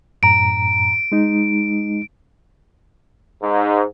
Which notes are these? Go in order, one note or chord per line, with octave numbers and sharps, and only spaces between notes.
F#2 A2 A#5 D7
G#3 D#4
G#2